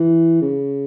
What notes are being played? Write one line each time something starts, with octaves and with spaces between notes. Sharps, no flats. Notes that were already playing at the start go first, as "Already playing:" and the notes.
Already playing: E3
C#3